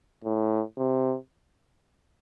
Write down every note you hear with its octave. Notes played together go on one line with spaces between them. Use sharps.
A2
C3